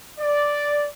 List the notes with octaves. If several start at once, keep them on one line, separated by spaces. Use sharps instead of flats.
D5